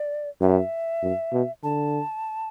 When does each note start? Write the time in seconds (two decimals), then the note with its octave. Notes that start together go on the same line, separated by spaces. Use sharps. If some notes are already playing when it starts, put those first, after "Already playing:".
Already playing: D5
0.41 F#2 E5
1.03 F#2
1.33 B2
1.63 D3 A5